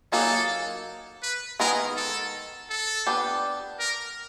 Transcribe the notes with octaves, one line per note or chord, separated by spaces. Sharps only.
F#3 A#3 D#4 G#4 A4
B4
D#3 G#3 B3 D#4 G#4 A#4
A4
A4
B3 D4 G4
A#4